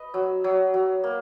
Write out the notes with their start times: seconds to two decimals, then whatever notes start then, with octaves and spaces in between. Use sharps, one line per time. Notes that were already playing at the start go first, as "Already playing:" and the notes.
Already playing: B4 D#5
0.14 F#3
0.44 F#3
0.74 F#3
1.04 A#3